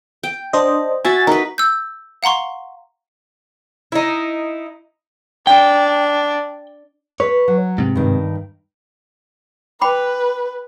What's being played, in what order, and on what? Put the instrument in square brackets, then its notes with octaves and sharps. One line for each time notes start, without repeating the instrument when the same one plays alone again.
[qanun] G5
[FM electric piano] D4 C5 D#5
[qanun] F#4 E5 [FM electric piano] G#5 A6
[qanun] D#4 B4 [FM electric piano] A#4
[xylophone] E6 G6
F5 F#5 A#5 C6 C#6
[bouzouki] D#4 E4
[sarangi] D4 [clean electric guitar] G5
[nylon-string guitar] B4 [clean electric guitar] C#5
[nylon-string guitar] F#3
[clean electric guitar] G#2 C3
[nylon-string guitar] G2 D#3
[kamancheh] B4 [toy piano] G5 B5 D6